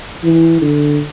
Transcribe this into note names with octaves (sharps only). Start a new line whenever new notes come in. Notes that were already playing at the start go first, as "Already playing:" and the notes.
E3
D3